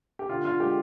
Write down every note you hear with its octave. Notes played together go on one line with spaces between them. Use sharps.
G4
D3 F4
D3 F4
G#3 G4